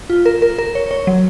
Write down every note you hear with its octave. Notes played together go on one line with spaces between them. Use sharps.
F4
A#4
A#4
A#4
C#5
C#5
F#3